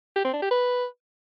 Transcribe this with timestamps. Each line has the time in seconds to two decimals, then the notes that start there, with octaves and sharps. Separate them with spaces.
0.16 G4
0.25 C4
0.33 D4
0.42 G4
0.51 B4